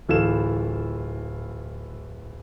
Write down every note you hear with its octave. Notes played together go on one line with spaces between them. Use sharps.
D1 E3 F4 A4 E7